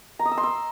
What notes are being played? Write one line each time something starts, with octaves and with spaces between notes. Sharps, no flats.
A#5
D#6
E6
C6
E6